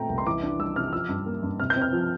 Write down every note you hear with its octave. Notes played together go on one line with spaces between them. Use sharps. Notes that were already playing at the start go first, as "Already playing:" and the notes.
Already playing: A#2 A3 C4 G5 A#5
C2
C6
E3 D6
D4
G3 E6
C3 F6
F3 E6
G2
A#3
G2
C3 F6
G6
C4
F6
F3